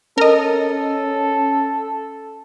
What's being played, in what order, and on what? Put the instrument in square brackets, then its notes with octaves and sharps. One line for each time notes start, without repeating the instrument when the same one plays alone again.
[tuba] C#4 [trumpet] A4 [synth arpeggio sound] A#4 D#5